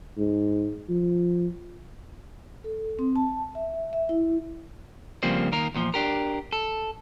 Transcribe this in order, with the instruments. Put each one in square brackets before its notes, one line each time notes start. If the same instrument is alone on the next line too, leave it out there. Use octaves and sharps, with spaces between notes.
[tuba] G#2
F3
[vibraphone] A4
C4
A5
E5
E5
E4
[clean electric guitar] C#3 F3 G3 A#3 C4
D#3 A#3 A#4
E2 A#2 D#3 F3
D4 G4 A#4
A4